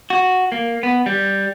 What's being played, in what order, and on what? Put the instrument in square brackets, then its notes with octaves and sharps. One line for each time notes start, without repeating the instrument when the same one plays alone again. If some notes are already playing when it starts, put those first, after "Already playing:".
[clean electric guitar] F#4
A#3
B3
G3